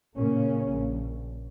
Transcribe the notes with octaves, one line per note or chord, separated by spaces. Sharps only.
A#2 C#3 A#3 C#4
A#1